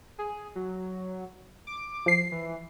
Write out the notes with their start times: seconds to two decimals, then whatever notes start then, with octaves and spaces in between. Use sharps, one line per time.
0.18 G#4
0.56 F#3
1.67 D6
2.06 F3 C7
2.32 E3